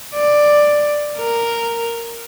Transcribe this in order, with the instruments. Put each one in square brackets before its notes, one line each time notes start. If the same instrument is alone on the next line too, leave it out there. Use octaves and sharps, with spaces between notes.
[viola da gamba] D5
A#4